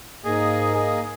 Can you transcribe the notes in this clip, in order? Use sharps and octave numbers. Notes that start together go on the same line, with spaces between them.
G#2 A#3 G#4 D#5
G#4